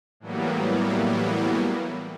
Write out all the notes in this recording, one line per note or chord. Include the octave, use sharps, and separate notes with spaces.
A2 E3 F#3 G3 A#3 B3